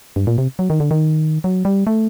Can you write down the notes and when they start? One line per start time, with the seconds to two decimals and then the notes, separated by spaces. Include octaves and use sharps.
0.16 G2
0.27 A#2
0.38 C3
0.59 F#3
0.70 D#3
0.80 D3
0.91 D#3
1.44 F#3
1.65 G3
1.87 A3